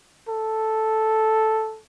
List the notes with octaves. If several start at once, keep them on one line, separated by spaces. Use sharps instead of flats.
A4